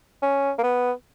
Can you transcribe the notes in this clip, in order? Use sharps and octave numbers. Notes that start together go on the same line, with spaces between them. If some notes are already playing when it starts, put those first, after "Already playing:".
C#4
A#3
B3